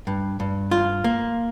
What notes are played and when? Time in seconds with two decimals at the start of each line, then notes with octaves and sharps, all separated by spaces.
0.07 G2
0.40 G2
0.71 F4
1.04 A#3